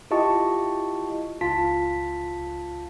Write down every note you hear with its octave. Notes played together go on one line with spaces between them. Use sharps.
E4 F4 G4 D#5 A5 C#6
C#2 F4 A5 B6